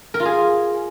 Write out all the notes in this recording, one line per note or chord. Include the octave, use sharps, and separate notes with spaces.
A#4
F4
G#4